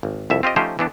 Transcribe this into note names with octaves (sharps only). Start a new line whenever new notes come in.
G#1
C2 F2 E5
C4 F4 G4 D#5
F3 A3 C#4 D#4 G4 C5
E3 B3 D4